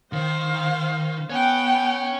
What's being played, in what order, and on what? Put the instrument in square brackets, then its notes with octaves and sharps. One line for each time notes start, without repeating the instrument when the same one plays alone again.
[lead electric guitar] D#3 [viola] C5 F5
[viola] B3 G5 [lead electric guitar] C#5 G#5